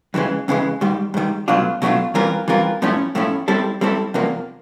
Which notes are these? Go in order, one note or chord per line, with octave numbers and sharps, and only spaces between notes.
F2 C#3 E3 G#3
F2 C#3 E3 G#3
G#2 D#3 G3
G#2 D#3 G3
B2 F#3 A3 D4 F4
B2 F#3 A3 D4 F4
E3 G3 C4 F4 A#4
E3 G3 C4 F4 A#4
A2 F3 A3 C#4 E4
A2 F3 A3 C#4 E4
G3 C4 E4 A4
G3 C4 E4 A4
E2 C3 F3 A#3